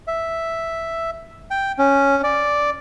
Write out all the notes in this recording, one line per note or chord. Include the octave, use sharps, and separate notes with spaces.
E5
G5
C#4
D5